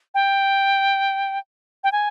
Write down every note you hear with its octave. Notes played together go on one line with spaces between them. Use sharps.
G5
G5
G#5